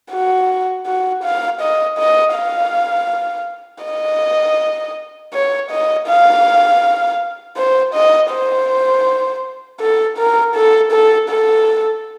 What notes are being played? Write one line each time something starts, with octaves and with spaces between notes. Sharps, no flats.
F#4
F#4
F5
D#5
D#5
F5
D#5
C#5
D#5
F5
C5
D#5
C5
A4
A#4
A4
A4
A4